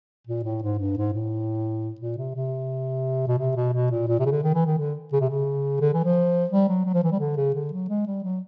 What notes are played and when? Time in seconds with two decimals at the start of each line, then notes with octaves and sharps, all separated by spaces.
0.27 A#2
0.44 A2
0.62 G#2
0.79 G2
0.97 G#2
1.14 A2
2.00 A#2
2.18 C3
2.35 C3
3.27 B2
3.38 C3
3.56 B2
3.74 B2
3.91 A#2
4.08 A#2
4.20 C3
4.26 C#3
4.31 D3
4.43 D#3
4.54 E3
4.66 D#3
4.78 D3
5.13 C#3
5.21 C3
5.30 C#3
5.81 D3
5.93 E3
6.04 F3
6.51 G3
6.68 F#3
6.85 F#3
6.94 F3
7.03 E3
7.11 G3
7.20 D3
7.37 C#3
7.55 D3
7.72 F#3
7.89 G#3
8.07 G3
8.23 F#3